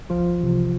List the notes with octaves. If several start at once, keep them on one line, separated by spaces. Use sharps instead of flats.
C2 F3 F4
C3 E3